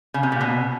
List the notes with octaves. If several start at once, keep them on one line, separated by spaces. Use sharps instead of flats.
C#3
C3
A#2
B2